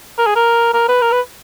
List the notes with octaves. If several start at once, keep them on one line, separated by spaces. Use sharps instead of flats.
A#4
G#4
A#4
A#4
B4
A#4
B4